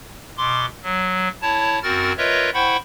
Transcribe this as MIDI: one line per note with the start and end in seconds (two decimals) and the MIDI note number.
0.37 0.66 47
0.37 0.66 84
0.37 0.66 86
0.83 1.29 54
1.42 1.79 64
1.42 1.79 73
1.42 1.79 81
1.83 2.12 42
1.83 2.12 60
1.83 2.12 66
1.83 2.12 70
1.83 2.12 89
1.83 2.12 93
2.18 2.50 65
2.18 2.50 70
2.18 2.50 71
2.18 2.50 73
2.18 2.50 75
2.18 2.50 76
2.54 2.77 64
2.54 2.77 72
2.54 2.77 78
2.54 2.77 79
2.54 2.77 83
2.54 2.77 85